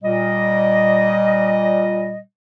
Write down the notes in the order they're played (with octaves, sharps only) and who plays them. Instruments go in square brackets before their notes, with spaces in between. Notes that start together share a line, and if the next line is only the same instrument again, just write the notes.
[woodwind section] A#2 G3 D#5